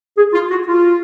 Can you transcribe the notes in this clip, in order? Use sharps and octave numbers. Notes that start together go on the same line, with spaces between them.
G#4
F4
F#4
F4